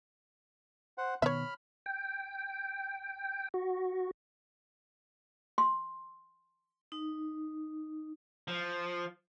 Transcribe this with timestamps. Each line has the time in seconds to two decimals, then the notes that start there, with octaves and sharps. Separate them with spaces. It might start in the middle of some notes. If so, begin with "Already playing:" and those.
0.98 C5 F#5
1.22 B2 D#3 B3 C#5 E5 B5 F6
1.86 G5
3.54 F#4
5.58 C6
6.92 D#4
8.48 F3